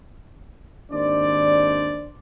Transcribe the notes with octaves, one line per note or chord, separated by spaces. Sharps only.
G#1 D#2 D4 C5 D5